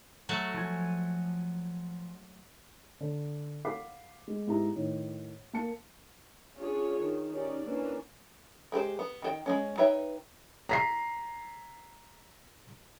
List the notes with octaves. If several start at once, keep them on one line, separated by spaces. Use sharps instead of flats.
F#3 A3 F#4
F3 G#5
D3
F5 F#5 B5 D6 B6 C7
G#3
G#2 B3 E4 G4 A#5
A2 D#3
A#3 A5 C#7
C#4 D4 F4 G#4 C#5
D#3
C#4 D#4 G4 D5
E3 A#3 C#4 D4
G#3 G4 B4 C5
B3
D#3 F#4 G5
G#3 A#3 C#4
D#4 B4 C#5 E5 G5
A#5 B6 C7